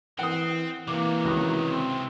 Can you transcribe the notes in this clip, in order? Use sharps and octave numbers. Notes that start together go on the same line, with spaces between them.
E3 C4 F#5 D#6
C3 E3 F#3 A#3 D6
C#2 D#3 F#4 F#6
C4